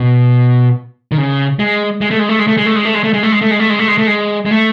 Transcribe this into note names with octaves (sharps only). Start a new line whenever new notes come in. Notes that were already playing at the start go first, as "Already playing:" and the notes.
Already playing: B2
D#3
C#3
G#3
G#3
A3
G#3
A3
G#3
A3
G#3
A3
G#3
A3
G#3
A3
G#3
A3
G#3
A3
G#3
A3
G#3
A3
G#3
A3
G#3
G#3
A3